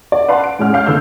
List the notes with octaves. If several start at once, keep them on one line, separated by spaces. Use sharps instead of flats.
D5
B4 D5 F5 F#5 A5 C6
D7
A2 G#3 C#4 F#5 F6
C#5 F5 F6 G6
F#1 D3 B3 A4 E6 G6